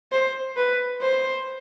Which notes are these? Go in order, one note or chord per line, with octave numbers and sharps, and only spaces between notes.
C5
B4
C5